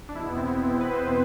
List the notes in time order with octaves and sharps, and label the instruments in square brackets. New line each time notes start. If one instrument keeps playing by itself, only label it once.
[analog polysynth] D4
E2 B2 E4
B3
C4
B3
C4
B4
C5
B4